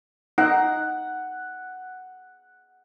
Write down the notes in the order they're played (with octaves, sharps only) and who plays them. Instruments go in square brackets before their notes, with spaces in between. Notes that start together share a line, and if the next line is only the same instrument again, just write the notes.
[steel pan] D#4 [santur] F#5